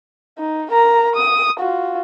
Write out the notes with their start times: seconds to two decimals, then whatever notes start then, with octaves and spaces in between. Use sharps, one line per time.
0.39 D#4
0.71 A#4 A#5
1.16 D#6
1.59 F4 F#4